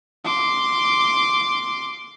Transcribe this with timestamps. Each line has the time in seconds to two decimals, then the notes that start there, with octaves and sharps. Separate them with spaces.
0.25 C6 D6